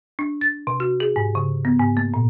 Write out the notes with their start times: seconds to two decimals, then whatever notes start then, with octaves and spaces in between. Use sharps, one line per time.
0.19 D4
0.41 A6
0.67 C3
0.80 F#4
1.00 G#4
1.16 G#2
1.35 C#3
1.65 B3
1.80 G#2
1.97 A#3
2.14 A#2